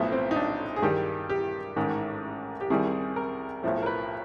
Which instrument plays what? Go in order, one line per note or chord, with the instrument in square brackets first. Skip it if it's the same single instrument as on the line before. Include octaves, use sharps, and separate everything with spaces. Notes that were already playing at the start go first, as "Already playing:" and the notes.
Already playing: [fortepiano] B1 A2 F3 A3 B3
C4
D#4
D4
G#4
G2 D#3 G3 G4
G4
A1 G#2 D#3
G4
C2 C3 D#3 G3 G#4
A#4
B1 A2 F3 A3
A#4
B4